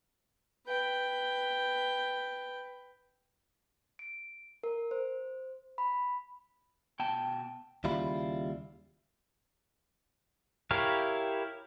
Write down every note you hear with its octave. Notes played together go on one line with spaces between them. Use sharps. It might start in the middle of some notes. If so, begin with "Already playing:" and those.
B4 G5
D7
A#4
C5
B5
B2 G5 A5
D#2 C#3 G3 E4 F4 B5
E4 G4 A#4 C#5 F5